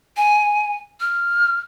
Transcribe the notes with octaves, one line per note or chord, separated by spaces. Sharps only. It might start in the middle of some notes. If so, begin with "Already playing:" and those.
G#5
F6